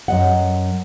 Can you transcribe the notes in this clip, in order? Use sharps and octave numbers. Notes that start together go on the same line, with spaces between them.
F#2 D#5 F#5